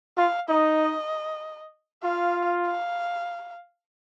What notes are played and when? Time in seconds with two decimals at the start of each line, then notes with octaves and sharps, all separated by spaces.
0.17 F4 F5
0.49 D#4 D#5
2.03 F4 F5
2.66 F5